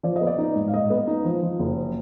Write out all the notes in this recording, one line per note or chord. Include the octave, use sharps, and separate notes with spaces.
F3 D5
D#5
B3
D5
D#4
G#2
F5
G#2 D#5
B3
D#4
F3
F3
F#1